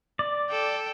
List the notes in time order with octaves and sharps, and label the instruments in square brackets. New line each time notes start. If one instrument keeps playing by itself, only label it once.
[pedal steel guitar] D5
[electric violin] A4 G5